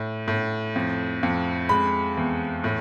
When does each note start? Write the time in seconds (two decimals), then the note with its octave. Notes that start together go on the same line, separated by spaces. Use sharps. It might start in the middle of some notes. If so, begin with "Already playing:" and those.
Already playing: A2
0.28 A2
0.76 F2
1.23 F2
1.69 G#3 B5
2.17 E2
2.64 A2